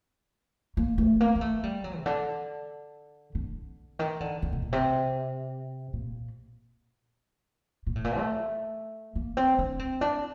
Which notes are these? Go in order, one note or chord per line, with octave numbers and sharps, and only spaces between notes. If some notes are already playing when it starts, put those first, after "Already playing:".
A#3
A3
A#3
A#3
A3
G3
F#3
C3
D3
D3
D#3
D3
D3
C3
A#2
C3
A#2
A#2
A2
A#2
A3
A#3
C4
D4
C4
D4